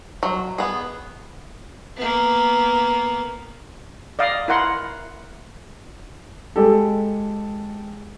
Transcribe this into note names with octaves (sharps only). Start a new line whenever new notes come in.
F#3
B3 G#4
A#3 B3
D5 D#5 F5
E4 A#4 F#5 C6
G#3 G4 A4